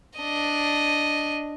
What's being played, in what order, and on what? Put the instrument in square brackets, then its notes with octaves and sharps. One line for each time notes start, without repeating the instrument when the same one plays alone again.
[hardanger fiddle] D4 D#5